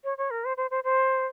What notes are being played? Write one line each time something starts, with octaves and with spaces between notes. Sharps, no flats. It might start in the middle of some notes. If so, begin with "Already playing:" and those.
C#5
C#5
A#4
C5
C5
C5
C5